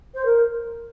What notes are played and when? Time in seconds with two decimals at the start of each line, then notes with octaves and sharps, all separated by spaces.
0.14 C5
0.25 A#4